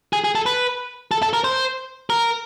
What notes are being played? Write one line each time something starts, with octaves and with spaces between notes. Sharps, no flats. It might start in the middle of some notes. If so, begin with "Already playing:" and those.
G#4
G#4
A4
B4
A4
A4
A#4
C5
A#4